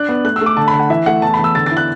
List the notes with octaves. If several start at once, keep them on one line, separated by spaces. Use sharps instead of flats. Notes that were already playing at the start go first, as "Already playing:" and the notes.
Already playing: D4 F#6
B3
A3 F#6
E6
A3
D6
D3 A5
B5
D3
F#5
E3 E5
A3 F#5
E2 A5
E2 B5
E6
D3 A6
E4 A6
F#6